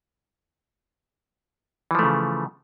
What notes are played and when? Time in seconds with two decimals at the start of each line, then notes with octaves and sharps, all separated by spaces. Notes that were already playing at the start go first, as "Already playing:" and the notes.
1.91 E3
1.95 F3
1.99 A3
2.03 C#3